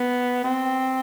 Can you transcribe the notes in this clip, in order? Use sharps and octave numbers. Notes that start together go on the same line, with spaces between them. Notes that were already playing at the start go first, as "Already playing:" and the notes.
Already playing: B3
C4